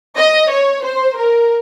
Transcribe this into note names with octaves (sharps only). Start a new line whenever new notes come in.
D#5
C#5
C5
A#4